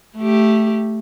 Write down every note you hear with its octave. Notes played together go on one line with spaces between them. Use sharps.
A3 G4